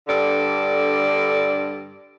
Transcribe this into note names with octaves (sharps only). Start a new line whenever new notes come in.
G2 D3 A4 D5